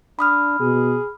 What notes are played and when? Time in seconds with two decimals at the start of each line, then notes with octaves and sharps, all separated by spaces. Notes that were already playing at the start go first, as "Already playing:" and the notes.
0.19 D4 B5 D#6 F6
0.60 B2 G#4